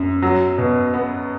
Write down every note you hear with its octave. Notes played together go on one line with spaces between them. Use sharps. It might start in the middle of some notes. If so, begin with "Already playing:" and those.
Already playing: F#2
F#3
B2
B3